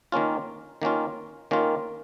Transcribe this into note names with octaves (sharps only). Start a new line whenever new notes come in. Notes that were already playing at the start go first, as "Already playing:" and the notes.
D#3 A#3 C#4 F4
D#3 A#3 C#4 F4
D#3 A#3 C#4 F4